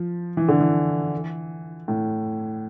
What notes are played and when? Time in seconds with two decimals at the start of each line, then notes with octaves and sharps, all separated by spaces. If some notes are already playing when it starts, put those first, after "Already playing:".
Already playing: F3
0.37 E3
0.48 D3
0.60 E3
1.88 A2